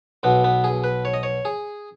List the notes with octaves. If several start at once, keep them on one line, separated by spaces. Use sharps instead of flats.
B1 B2 B3
B3
G#4
B4
C#5
D#5
C#5
G#4